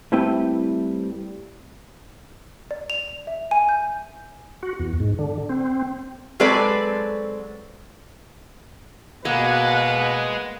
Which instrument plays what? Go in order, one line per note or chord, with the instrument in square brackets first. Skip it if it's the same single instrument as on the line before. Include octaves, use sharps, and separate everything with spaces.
[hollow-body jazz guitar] G3 A3 C4 E4 B4 G5
[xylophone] D5
F7
E5
G#5
G6
[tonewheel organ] F#4
E2
G#2
D3
C4
[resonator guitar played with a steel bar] F#3 G#3 C4 A4 B4 D5
[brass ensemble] B2 B4 [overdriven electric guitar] G#3 [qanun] A#3 [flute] F#5